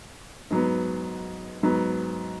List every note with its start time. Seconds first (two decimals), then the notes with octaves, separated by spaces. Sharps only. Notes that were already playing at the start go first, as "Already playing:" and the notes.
0.51 G#2 F#3 B3
1.63 G#2 F#3 B3